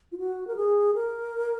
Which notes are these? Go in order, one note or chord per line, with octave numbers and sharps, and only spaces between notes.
F4
F#4
A#4
G#4
A#4